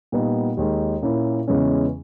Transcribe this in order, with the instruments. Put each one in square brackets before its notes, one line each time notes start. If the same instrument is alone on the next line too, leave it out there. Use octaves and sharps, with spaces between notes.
[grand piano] A#2 G3 B3 D#4
D#2 D#3 G#3
A#2 A#3 C#4 E4
E2 C#3 E3 G#3 C#4